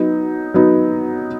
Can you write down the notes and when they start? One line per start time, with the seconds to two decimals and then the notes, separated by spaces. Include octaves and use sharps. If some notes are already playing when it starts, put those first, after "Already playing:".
Already playing: F#3 B3 D#4
0.54 F#3 B3 D#4